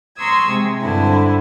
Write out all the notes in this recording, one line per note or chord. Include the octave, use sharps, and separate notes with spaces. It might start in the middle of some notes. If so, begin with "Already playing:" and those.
A#5 C6 C#6 D#6 E6 G#6
C3 G#3
G2 D3 C4 E4